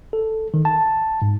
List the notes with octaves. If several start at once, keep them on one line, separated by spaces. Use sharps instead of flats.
A4
D#3
A5
G#2